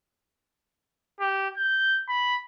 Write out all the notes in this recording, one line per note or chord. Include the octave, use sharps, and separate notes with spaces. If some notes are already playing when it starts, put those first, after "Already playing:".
G4
G6
B5